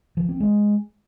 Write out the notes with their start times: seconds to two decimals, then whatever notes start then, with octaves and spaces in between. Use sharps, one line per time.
0.17 F3
0.29 C4
0.40 G#3